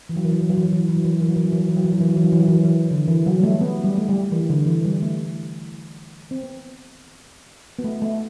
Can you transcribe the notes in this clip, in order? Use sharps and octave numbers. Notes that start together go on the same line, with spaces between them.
E3
F#3
E3
F#3
E3
F#3
E3
F#3
E3
F#3
E3
F#3
E3
F#3
E3
F#3
E3
F#3
E3
F#3
E3
F#3
E3
F#3
E3
F#3
E3
F#3
E3
F#3
E3
F#3
E3
D3
E3
F#3
G3
A3
B3
G3
A3
G3
E3
D3
E3
G3
A3
C4
B3
B3
A3
A3